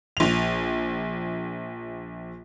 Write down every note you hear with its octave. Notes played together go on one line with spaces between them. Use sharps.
A#1 F7